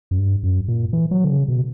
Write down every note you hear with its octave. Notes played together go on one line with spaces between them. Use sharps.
F#2
G2
F#2
A#2
E3
F#3
D3
C#3
B2